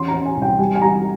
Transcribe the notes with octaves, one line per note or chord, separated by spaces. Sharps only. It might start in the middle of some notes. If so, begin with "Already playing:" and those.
Already playing: E2 C#4 C6
A#5
C#4
G#5
C2
G5
G3 G#5
G#5
G3 A#5